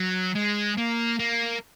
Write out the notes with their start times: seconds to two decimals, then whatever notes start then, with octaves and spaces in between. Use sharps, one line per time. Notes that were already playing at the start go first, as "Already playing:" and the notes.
Already playing: F#3
0.36 G#3
0.78 A#3
1.19 A#3